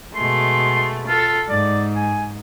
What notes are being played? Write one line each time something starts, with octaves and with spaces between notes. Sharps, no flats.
B2 G#3 A3 C6
F4 A4
G#2 D5
G#5